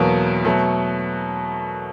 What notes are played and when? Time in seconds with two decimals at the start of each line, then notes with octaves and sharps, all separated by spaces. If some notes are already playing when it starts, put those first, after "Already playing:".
Already playing: E2 B2 F#3 A#3
0.45 B2 F#3 A3